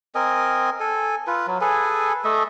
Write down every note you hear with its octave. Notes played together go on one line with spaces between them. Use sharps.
C4 A#4 D#5 G#5
A4 G#5
F4 B4
F#3
G#4 A4 B4 G#5
A3 A4 D#5 E5